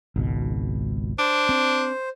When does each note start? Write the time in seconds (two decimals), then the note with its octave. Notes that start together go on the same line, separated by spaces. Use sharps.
0.16 G#1 C#2 B2
1.19 D4 C5
1.49 C4